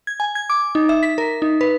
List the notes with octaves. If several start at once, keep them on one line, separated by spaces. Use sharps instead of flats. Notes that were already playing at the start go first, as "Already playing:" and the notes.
G#6
G#5
G#6
D6
D#4
E5
B6
A#4
D#4
B4